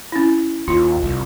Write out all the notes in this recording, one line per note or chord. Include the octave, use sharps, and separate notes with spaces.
C#4 E4
D#2 F4
C2